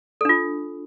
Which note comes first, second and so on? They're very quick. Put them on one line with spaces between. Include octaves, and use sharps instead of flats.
A4 D4 F4